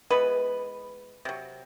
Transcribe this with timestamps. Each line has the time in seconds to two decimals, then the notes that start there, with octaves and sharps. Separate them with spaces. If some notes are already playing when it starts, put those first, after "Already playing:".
0.10 E3 G#3 B3 B4
1.25 C3 F#3